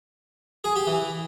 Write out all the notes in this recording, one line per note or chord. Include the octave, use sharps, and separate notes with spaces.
G#4
G4
E3